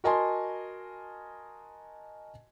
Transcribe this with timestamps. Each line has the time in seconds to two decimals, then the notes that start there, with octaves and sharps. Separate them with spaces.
0.04 F#4 A#4 D#5 G#5 A5 C6